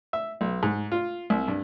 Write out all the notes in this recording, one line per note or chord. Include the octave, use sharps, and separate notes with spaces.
E5
B1
G#2
F4
C2
G2